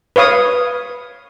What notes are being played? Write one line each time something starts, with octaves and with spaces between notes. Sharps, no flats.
B4 C#5 F5 D#6